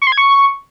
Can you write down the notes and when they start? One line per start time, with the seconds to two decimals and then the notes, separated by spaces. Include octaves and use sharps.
0.02 C#6
0.07 C6
0.12 G#6
0.18 C#6